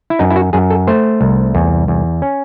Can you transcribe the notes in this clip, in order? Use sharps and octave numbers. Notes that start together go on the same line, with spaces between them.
E4
F#2 D#4
E4
F#4
F#2 G#4
A4
A3 C5
C2
E2
E2
C#4